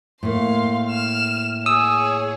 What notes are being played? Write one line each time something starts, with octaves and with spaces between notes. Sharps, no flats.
A2 A#3 F5 C6
F6 E7
G#4 C#5 D#6 E6